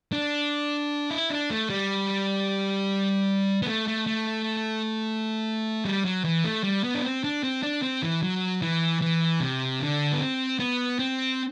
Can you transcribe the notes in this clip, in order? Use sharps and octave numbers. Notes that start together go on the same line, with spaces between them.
D4
E4
D4
A3
G3
B3
A3
A3
A3
G3
F#3
E3
A3
G3
B3
D4
C4
D4
C4
D4
C4
E3
F#3
E3
E3
C3
D3
B3
C4
B3
C4